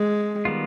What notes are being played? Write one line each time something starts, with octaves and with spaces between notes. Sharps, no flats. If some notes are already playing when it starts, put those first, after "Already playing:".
Already playing: G#3
D#3 G3 B3 F4